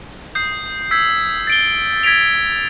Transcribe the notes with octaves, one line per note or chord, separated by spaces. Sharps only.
D#6 G6 C7
E6 G#6 B6
A6 D7 G7
G#6 B6 D7 F7